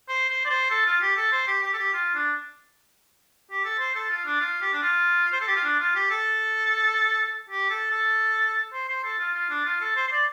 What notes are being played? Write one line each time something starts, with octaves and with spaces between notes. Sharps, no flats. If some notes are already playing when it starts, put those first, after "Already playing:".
C5
C5
D5
C5
A4
F4
G4
A4
C5
G4
G4
A4
G4
F4
D4
G4
A4
C5
A4
F4
D4
F4
G4
D4
F4
C5
A4
G4
F4
D4
F4
G4
A4
G4
A4
A4
C5
C5
A4
F4
F4
D4
F4
A4
C5
C5
D5